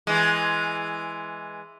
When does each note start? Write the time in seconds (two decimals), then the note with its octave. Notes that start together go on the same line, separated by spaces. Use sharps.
0.07 E3 G#3